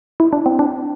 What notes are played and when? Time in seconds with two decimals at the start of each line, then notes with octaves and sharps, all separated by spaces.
0.20 E4
0.33 D4
0.46 C4
0.59 D4